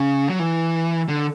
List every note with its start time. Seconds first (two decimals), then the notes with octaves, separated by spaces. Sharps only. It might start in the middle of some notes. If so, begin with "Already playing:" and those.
Already playing: C#3
0.29 F#3
0.39 E3
1.08 D3